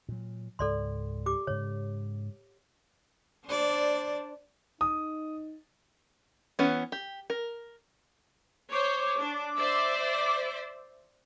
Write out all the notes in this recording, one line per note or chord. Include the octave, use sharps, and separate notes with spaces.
A#2 F#3
C#2 G#2 A4 D5 C6
G4 D6
G#2 C#3 C#5
D4 C5 D5
D#4 D#6
E3 B3 C#4
G4
A#4
C5 C#5 D6
D4
C5 D5 E5